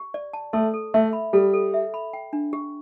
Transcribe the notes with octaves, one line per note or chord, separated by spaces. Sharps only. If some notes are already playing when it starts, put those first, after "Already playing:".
Already playing: G4
D5
A5
A3 A4
A4
A3 E5
B5
G3 A4
A4
E5
B5
G5
D4
G4